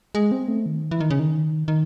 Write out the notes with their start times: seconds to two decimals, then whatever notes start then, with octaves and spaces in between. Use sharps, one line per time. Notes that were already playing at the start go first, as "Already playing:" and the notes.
0.15 G#3
0.32 C4
0.48 A3
0.66 D#3
0.91 E3
1.00 D#3
1.10 C#3
1.20 D#3
1.68 D#3